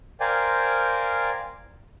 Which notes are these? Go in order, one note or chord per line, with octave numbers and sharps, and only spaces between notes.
A#4 C5 D5 F5 G5 G#5